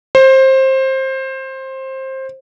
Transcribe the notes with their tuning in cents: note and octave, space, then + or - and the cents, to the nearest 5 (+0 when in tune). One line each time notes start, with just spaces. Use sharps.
C5 +20